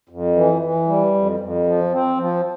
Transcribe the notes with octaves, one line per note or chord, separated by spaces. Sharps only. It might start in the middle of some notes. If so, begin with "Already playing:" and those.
F2
E3
E3
G3
F2
F2
F3
C4
F3